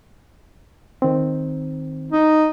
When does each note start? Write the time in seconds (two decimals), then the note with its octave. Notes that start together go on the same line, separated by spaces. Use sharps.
1.02 D#3 C4
2.11 D#4